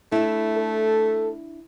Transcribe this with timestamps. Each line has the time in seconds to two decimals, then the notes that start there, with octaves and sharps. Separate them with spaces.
0.12 A3 D4 E4
0.57 A4